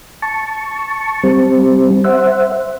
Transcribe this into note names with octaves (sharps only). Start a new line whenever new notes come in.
A5 C#6
G3 C4
C5 E5 F#5